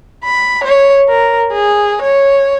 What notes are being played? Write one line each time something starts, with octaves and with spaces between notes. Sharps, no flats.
B5
C#5
A#4
G#4
C#5